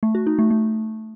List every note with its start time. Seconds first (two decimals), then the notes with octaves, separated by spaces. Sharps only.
0.03 A3
0.15 F#4
0.27 D#4
0.39 A3
0.51 A3